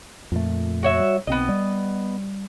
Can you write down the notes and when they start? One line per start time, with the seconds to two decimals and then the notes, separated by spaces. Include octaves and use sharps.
0.32 F2 A#2 A3
0.83 F#4 C#5 E5
1.00 G3
1.27 B1 B3 C4 D#5
1.49 G3